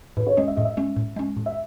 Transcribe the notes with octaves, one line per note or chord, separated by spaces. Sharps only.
A2 B4
C#5
G#3 C#4 D#5
E5
A2 D#5
E5
G#3 C#4
A2
G#3 C#4
A2
E5